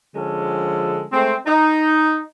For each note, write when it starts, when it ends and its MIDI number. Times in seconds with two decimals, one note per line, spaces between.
0.15 1.06 50
0.15 1.06 53
0.15 1.06 56
0.15 1.06 61
0.15 1.06 69
1.12 1.35 56
1.12 1.35 57
1.12 1.35 60
1.46 2.21 63